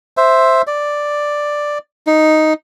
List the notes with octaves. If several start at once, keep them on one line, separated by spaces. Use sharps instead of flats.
C5 E5
D5
D#4